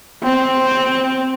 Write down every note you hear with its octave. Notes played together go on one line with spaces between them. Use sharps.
C4